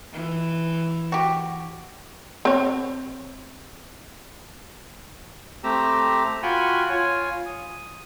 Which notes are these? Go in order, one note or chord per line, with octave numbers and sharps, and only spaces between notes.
E3
F#4 G4
C4 C#5
A3 C4 G4 A#5 E6
F4 F#4 G5 G#5 B5 C#6
F4 C#5 G#5
D#6